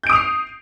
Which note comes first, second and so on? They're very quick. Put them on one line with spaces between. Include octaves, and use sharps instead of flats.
G6 D7 D#6 F7 C7